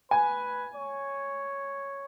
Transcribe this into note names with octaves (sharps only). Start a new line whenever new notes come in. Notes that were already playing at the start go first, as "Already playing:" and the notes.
B4 G#5
C#5